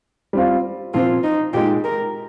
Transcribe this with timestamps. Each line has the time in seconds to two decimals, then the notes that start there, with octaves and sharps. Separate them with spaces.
0.33 G3 C4 F4
0.94 A#2 F3 C4 F4
1.24 D#4
1.53 A#2 G#3 D#4 G4
1.84 A#4